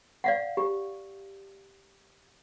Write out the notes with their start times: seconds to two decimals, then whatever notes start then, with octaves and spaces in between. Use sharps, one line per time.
0.24 D5 F5 F#5
0.57 G4